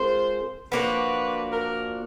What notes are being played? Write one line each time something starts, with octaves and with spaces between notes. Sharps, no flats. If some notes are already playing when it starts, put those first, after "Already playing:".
Already playing: G#3 C4 F4 A#4 C5
F3 A#3 D4 F#4 B4
A#4